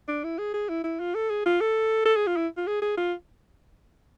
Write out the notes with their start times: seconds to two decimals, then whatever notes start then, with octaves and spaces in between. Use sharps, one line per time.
0.08 D4
0.24 E4
0.39 G#4
0.54 G#4
0.69 E4
0.84 E4
1.00 F4
1.15 A4
1.30 G#4
1.46 F4
1.60 A4
2.05 A4
2.16 G#4
2.27 F4
2.36 E4
2.57 F4
2.67 G#4
2.82 G#4
2.97 F4